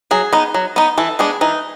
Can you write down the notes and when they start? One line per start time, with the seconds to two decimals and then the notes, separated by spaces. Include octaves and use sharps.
0.11 F#3 G#4
0.33 B3 D#4
0.54 F#3
0.76 B3 D#4
0.98 E3 A4
1.19 G#3 B3 D4 G#4
1.41 E3 D#4